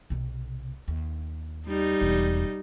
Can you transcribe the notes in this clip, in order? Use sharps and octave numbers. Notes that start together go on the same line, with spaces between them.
B1 C3
D#2
G3 D#4
E1 E2